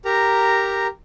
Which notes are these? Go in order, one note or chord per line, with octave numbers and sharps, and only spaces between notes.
G4 A#4 A#5